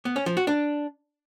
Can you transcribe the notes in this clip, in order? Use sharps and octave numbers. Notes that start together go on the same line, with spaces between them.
B3
C#4
F3
F#4
D4